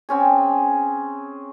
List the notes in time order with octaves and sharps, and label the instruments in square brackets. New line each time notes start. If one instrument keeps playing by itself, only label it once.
[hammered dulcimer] C4 C#4 G#4